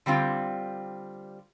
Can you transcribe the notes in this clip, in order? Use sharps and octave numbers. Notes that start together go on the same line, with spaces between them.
D3 G3 C4 F4